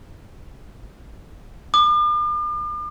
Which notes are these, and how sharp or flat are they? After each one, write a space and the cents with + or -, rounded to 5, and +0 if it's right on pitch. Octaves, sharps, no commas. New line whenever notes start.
D6 +45